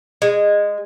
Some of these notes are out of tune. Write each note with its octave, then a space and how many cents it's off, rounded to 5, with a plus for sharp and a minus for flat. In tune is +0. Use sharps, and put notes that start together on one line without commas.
G#3 -15